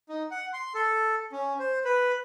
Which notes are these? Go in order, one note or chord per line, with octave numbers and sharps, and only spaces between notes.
D#4
F#5
C6
A4
C#4
C5
B4